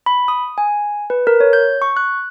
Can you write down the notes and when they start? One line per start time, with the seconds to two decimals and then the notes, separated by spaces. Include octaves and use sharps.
0.06 B5
0.28 D#6
0.58 G#5
1.10 B4
1.27 A#4
1.40 C#5
1.53 G6
1.82 C#6
1.97 F#6